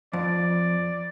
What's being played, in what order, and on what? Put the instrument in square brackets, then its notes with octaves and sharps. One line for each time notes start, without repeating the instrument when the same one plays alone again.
[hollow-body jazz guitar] F2 [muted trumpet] D5